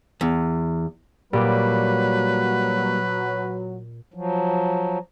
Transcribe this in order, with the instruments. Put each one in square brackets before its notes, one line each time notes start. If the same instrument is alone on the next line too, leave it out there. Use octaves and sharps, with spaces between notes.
[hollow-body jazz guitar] E2
[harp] A#2 [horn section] F#3 [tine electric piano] G3 A#3 G4 [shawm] B4
[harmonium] F3 F#3